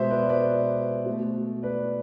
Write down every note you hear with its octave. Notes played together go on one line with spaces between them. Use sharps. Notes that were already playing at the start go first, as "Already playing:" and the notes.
Already playing: B2 G#3 C5 E5
B4 D5
B4 D5
B2 A3
B4 D5